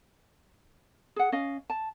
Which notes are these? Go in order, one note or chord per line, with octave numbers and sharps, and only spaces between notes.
G#4 F#5
C#4 D#5 F5
A5